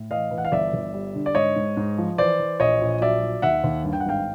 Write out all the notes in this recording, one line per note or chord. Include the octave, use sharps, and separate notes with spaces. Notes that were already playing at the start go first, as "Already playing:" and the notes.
Already playing: A2
E3 D#5 F5
E3
F#5
F5
G1 D5 E5
G1
G3
D3
D5
G#2 C#5 D#5
G#2
G#2
F3
E3 C5 D5
E3
A#1 C#5 D#5
A#1
F#3 D5 E5
F#3
D#2 E5 F#5
D#2
G2
G5
F#5
G#1 F5 G5